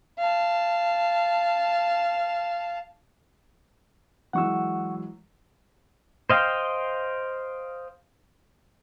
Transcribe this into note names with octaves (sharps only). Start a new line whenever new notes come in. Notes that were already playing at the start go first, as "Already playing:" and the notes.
F5 A5
E3 F#3 G#3 F#5 C#6 E6
C5 D#5 F5 G5